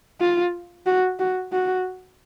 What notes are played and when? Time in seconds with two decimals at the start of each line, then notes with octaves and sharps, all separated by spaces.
0.20 F4
0.86 F#4
1.19 F#4
1.53 F#4